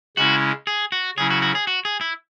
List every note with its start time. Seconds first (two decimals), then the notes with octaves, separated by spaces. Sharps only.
0.17 C#3 G#3 C#4 E4 F#4
0.67 G#4
0.92 F#4
1.17 C#3 F#3 C#4 E4 G#4
1.30 F#4
1.42 F#4
1.55 G#4
1.67 F#4
1.85 G#4
2.01 E4